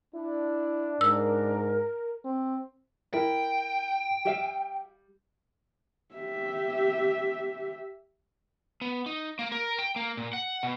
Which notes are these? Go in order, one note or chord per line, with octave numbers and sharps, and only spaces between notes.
D4 E4
G#2 A#4 E6
C4
E4 A#4 G5
G3 G4 E5 F5
G4 E5
B3
D#4
A#3
A#4
G5
A#3
A#2
F#5
B2